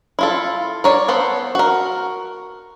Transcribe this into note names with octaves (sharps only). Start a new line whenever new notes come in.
E4 F4 A4
A#4 C#5 D5
B3 A4 C5
F#4 A#4